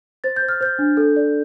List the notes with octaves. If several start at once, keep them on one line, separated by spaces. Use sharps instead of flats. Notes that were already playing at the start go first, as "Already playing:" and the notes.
C5 A6
G6
C5
F6
C5 G6
D4
A4
D5